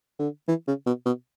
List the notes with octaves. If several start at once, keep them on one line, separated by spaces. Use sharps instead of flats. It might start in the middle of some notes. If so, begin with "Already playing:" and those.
D3
E3
C#3
B2
B2